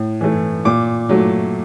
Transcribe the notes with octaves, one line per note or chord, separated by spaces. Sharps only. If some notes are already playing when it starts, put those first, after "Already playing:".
Already playing: A2
E3 A3
A#2 D6
F#3 A3